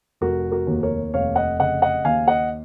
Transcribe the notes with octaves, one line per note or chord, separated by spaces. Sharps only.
F1 F#4 A#4
F#4 A#4
D#2
A#4 C#5
F1 C#5 F5
D#5 F#5
C#3 D#5 F#5
D#5 F#5
D#2 F5 G#5
D#5 F#5